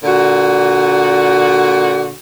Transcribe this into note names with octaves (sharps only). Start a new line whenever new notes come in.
A#2 D3 F#4